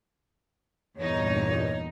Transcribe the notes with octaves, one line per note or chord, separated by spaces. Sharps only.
E2 G2 A#2 D#4 C#5